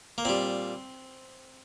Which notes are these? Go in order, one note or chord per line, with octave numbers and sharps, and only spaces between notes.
A#3
A#2 G3 C4